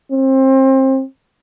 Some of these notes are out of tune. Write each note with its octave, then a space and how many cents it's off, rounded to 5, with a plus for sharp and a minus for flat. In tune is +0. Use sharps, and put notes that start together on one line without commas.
C4 +25